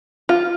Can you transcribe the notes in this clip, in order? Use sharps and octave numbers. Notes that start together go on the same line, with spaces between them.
F4